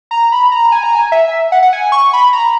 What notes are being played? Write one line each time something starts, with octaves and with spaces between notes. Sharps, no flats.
A#5
B5
A#5
G#5
A#5
G#5
E5
F#5
F#5
G#5
C#6
B5
A#5